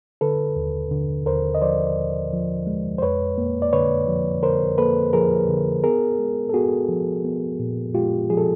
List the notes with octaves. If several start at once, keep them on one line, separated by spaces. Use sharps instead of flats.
D3 A4 B4
D#2
D3
D#2 A#4 C5
D#5
F3 C5 D5
D#2
F3
G#3
C5
F2 B4 C#5
A#3
D5
D3 B4 C#5
F3
D3 A#4 C5
A#3 A4 B4
F3 G#4 A#4
D3
B3 G#4 A#4
G#3
A4
B3 F#4 G#4
F3
B3
A#2
G#3 F4 G4
F3 G#4
A4